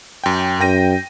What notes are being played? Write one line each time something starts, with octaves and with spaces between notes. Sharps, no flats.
F#2 G5
F#2 G5 A#6 D#7